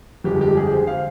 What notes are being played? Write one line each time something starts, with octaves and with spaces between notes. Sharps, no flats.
G1 F2 D3 F3 G#3 G4
G4
G#4
C5
F5